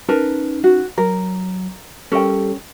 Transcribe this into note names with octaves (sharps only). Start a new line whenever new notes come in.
C#4 D#4 A#4 B4 A5
F#4
F#3 A#4
G3 C#4 G4 A4 A#4 G5